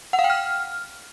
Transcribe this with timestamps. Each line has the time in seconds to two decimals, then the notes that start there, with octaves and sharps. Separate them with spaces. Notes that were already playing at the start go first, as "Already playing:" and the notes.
0.13 F#5
0.19 F5
0.24 G5
0.30 F6